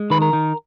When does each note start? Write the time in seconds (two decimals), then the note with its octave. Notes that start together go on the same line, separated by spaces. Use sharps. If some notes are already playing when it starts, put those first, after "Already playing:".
Already playing: G#3
0.10 D#3 B4
0.22 A#4
0.33 D#3